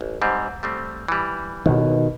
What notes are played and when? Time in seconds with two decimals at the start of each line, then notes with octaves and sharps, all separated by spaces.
0.01 A1
0.22 G#2 G3 C4
0.63 G3 A3 C4
1.08 E3 G3
1.66 A1 B2 D#3